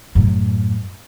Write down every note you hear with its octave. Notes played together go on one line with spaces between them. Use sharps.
F#2 A2